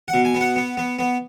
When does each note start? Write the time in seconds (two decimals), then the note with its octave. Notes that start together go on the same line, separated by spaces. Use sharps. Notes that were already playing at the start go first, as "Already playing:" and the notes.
0.08 F#5
0.14 B2
0.25 G#5
0.35 B3
0.41 F#5
0.56 B3
0.77 B3
0.99 B3